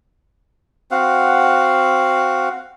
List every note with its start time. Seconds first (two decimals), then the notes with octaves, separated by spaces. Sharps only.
0.91 C4 F#4 F5 F#5